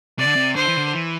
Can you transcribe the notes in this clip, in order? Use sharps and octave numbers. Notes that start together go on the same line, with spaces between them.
C3 D5
D3
C3
D3 C5
E3
D3
E3